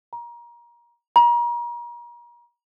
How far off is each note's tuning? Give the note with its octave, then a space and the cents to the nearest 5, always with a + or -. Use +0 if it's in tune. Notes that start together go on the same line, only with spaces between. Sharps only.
A#5 +25
A#5 +35